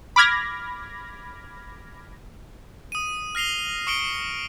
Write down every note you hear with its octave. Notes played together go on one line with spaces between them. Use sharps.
B5 D6 F6 G#6 A#6
D#6 D#7
F6 A#6 C7 F7 G7
C#6 D#6 C#7 D7 G7